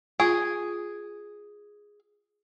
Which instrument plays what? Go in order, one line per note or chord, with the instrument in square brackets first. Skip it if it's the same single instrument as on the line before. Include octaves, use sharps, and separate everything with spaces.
[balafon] F4 [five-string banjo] G#4